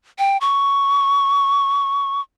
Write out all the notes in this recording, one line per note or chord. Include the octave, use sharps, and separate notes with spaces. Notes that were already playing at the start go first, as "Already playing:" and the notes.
G5
C#6